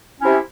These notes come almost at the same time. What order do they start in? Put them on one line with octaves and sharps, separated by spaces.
C#4 E4 C3